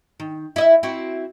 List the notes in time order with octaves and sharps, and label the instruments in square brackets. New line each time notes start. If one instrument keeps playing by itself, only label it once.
[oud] D#3
E4 D#5 E5
C4 E4 F#4